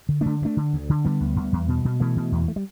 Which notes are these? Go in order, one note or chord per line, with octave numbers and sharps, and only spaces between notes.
D3
D3 A3 D4
D2
A3 D4
D3
D2
D3
D3 G3 B3
D2
D2
E2
B2
B2
B2 E3 A3
B2
E2
A3
G3